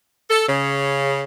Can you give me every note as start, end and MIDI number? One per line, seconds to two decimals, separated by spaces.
0.30 0.45 69
0.48 1.22 49